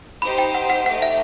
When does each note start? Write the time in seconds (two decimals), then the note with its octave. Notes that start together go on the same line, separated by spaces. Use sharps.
0.22 D#4 G4 C5 B5
0.38 G5
0.55 F#5
0.70 F#5
0.86 A3 D#4 G4 F#5
1.02 E5